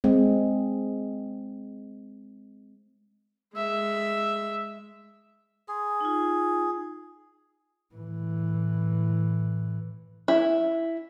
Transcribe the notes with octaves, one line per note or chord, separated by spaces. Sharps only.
G#3 C4
G#3 E5
G#4 C6
D#4 F4
A2 E3
E4